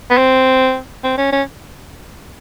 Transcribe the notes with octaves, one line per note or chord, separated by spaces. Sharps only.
B3
C4
C4
C#4
C#4